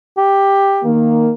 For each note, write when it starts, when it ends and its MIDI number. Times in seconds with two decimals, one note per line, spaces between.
0.17 0.90 67
0.83 1.31 51
0.83 1.31 58